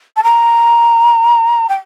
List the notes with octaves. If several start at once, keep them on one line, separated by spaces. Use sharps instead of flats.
A5
A#5
G5